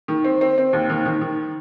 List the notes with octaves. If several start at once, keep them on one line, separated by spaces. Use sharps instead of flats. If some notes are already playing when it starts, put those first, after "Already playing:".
D#3
C4
C4
C4
D#2
D#3
D#3
D#3